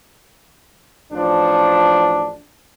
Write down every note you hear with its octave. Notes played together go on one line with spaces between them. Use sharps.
A1 F3 D4